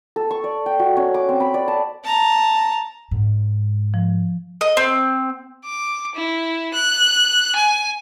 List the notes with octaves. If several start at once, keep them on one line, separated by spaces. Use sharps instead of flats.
A4
C#6
D5
G5
F#4
C#4
D6
C4
B5
D5
A5
A5 A#5
G#2
F3
D#5
C4
D6
E4
F#6
G#5